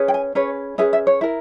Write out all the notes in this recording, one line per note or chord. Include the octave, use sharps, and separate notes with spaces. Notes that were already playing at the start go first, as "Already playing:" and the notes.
Already playing: C#4 G#4 B4
G5
G#5
C#4 G#4 B4 C#5
C#4 G#4 B4 E5
E5
C#5
E4 A#4